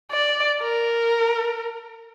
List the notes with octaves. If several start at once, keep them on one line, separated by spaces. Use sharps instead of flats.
D5
A#4